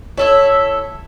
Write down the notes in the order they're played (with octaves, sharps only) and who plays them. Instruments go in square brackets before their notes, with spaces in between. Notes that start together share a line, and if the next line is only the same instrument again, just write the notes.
[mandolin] E4 A4 E5 [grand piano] C#5